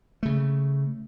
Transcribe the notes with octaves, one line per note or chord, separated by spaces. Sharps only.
C#3 A3